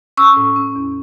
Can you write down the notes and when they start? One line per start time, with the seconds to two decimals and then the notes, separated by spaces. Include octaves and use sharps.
0.17 C#4 C#6 E6
0.37 A2
0.56 C#4
0.76 E2